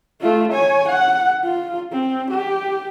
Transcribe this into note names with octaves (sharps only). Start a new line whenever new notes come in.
A3 F4
C#5 G#5
F#5
F4
C4
G4